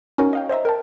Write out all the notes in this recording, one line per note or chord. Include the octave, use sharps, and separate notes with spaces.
C#4 D#4 F#4 A#4 C#5
D#5 F5 G5
C5 D#5 E5 A#5
A#4 G5 A5